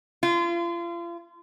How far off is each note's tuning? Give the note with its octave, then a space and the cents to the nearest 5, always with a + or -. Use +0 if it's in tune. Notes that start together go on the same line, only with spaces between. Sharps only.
F4 -35